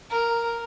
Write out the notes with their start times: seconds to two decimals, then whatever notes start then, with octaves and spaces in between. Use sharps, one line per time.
0.10 A#4